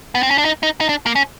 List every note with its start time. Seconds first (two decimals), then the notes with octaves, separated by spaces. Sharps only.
0.15 B3
0.23 C4
0.31 C#4
0.38 D4
0.45 D#4
0.63 D#4
0.81 D#4
0.89 D4
1.06 A#3
1.15 C#4